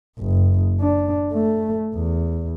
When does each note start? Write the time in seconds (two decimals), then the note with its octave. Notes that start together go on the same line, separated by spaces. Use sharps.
0.19 F#1
0.80 D4
1.33 A3
1.95 E2